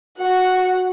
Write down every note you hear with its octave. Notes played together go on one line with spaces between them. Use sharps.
F#4 F#5